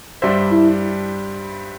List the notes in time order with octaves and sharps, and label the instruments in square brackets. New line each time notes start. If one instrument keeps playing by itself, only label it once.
[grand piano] G2 G3 D4 C5 E5
[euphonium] E4